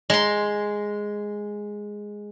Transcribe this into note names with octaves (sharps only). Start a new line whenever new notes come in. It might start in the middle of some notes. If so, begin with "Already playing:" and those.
G#3 C6